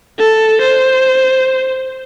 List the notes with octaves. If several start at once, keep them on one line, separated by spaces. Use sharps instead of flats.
A4
C5